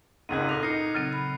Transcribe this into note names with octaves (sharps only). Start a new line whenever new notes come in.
G#1 C#2 G#2 F#6 G#6 D#7
A#2 A4 F6 A#6 F7
D#4 C7 C#7
C#3 F#3 C4
B5